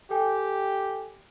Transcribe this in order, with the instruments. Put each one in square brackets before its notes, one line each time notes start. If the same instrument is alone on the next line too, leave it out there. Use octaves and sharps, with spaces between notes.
[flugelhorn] G4 [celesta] A4 G5 G#5